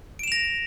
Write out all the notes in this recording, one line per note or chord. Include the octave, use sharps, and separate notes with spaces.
A#6 D7 E7 F7